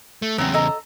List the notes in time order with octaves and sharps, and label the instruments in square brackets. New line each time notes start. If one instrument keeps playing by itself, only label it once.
[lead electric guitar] A3
[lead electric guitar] E2 C#3 [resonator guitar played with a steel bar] F#3 C4
[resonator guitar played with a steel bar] A4 D#5 A#5